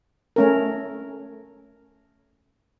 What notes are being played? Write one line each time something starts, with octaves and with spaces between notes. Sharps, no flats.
A3 C#4 A#4